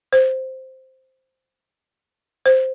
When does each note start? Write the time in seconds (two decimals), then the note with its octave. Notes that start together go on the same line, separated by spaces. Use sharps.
0.13 C5
2.46 C5